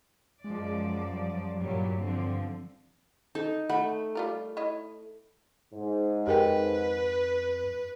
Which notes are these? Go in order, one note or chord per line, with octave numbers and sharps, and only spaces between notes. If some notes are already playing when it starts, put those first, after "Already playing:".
F#2 F3 G#3 D5
G3
G2 A#2 F#3 G3
D3 F3 C4
D#4 A4
A3 F#5 B5
G3 F4 A#4
E4 C#5 D#5
G#2
F2 G4 A#4 B4 G5